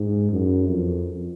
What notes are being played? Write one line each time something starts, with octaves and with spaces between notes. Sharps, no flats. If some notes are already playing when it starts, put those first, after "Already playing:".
Already playing: G#2
F#2
F2